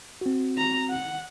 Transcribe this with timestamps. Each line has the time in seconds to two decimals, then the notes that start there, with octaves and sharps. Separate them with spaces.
0.21 C4 F#4
0.58 A#5
0.90 F#5